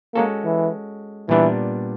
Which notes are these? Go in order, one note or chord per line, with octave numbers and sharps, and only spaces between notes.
G#3 A#3 C#4 F#4 A4
E3
A#2 E3 G3 B3 D4